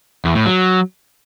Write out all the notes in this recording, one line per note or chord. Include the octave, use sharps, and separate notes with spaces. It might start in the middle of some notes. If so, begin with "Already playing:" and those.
E2
A2
F#3